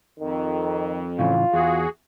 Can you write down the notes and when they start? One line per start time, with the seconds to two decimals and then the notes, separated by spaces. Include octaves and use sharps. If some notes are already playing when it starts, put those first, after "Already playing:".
0.19 F2 D#3
1.19 A2 C#3 E3 F4
1.53 E2 F#4 G#4